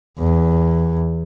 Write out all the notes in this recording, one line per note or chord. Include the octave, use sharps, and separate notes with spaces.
E2